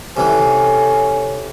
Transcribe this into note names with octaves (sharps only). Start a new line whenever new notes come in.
C3 E3 C#4 A4